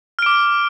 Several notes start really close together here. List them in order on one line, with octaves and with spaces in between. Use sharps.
F6 D7 D6